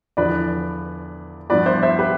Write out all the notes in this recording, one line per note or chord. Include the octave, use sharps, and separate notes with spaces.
E2 D3 F3 B4 D5
G2 F3 B3 B4 D5
C5 E5
C5 E5
G4 B4